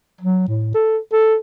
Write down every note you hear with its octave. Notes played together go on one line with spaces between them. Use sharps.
F#3
A2
A4
A4